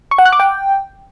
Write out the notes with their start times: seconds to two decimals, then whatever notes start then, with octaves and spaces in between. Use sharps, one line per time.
0.11 C#6
0.18 F#5
0.25 F#6
0.33 D6
0.40 G5